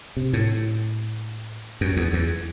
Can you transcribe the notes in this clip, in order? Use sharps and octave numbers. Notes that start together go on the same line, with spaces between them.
C3
A2
F#2
E2
E2